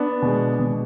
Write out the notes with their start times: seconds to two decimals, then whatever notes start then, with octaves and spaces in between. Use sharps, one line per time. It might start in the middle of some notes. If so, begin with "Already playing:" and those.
Already playing: B3 D4
0.22 B2 G#3
0.59 B2 G#3